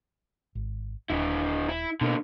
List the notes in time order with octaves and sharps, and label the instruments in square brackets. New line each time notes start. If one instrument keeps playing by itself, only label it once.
[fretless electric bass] G#1
[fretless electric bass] D#1 [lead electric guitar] D3 E4
[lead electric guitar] E4
[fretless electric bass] B2 [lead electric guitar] D3 A#3